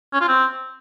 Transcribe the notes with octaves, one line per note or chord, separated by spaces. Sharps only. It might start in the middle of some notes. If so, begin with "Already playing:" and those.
C#4
F4
C4